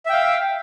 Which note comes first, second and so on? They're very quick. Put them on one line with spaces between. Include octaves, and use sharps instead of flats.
E5 G5 F5